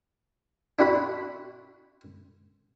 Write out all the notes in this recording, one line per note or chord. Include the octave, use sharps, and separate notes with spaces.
D4 E4 F#4 F#5 B5